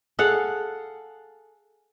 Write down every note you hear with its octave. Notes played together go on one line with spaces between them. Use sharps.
G#4 A4 F5 F#5